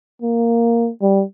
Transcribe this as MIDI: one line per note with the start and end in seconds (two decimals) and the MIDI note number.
0.22 0.90 58
1.02 1.23 55